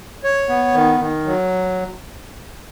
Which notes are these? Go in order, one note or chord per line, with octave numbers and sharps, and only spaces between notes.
C#5
B3
D#3
D#3
F#3